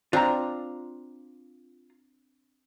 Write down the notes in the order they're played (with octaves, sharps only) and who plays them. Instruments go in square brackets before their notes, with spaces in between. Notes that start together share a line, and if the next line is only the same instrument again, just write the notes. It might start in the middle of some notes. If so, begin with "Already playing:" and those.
[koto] C4 D4 [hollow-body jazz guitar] F4 A#5